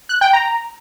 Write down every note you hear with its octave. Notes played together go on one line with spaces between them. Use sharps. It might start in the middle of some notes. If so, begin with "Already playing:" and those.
F#6
G5
A#5